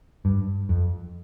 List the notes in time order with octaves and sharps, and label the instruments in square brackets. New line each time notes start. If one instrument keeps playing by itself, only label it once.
[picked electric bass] G2
F2